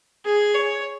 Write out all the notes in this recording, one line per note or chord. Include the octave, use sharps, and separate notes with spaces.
G#4
C#5